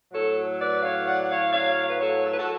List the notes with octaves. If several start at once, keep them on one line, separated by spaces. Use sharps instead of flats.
A2 F#3 A4 C#5
B4 D5
C#5 F5
D5 F#5
F#5
C#5 F5
D5
C#5 F5
B4
A4 C#5
A4
B4
F#4 A4